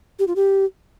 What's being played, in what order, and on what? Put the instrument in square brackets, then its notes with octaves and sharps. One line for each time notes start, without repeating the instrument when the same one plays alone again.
[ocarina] G4
F4
G4